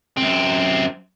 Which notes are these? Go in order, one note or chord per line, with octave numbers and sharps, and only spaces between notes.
F#2 C4